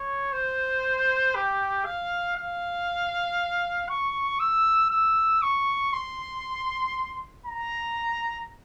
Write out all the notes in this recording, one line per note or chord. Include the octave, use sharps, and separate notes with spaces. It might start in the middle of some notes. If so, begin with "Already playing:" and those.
Already playing: C#5
C5
G4
F5
F5
C#6
E6
E6
C#6
C6
A#5